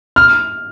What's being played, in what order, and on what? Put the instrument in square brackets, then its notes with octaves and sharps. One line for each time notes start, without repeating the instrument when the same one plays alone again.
[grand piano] F6